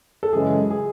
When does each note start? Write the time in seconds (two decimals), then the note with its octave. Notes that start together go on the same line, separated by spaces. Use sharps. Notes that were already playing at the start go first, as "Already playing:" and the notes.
0.23 A4
0.33 F#2 C#3 E3 G#3 G#4
0.71 G#4